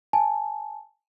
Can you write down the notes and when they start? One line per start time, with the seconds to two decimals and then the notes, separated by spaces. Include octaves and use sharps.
0.13 G#5 A5